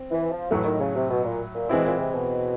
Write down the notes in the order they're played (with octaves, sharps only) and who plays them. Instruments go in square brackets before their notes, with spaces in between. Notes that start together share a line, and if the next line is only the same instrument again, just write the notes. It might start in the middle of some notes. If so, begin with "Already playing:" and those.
Already playing: [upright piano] C4
[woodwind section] E3
F3
[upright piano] A2 F#3 A3 [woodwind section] E3
[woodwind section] D#3
C#3
C3
B2
A#2
A#2
[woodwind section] B2 [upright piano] E3 G#3 C4 E4
[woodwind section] A#2
C3
B2